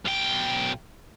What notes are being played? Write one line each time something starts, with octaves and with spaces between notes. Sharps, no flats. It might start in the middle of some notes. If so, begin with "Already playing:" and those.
B1 G5